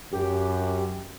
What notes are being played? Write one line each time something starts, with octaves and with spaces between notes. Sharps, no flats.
F#2 G4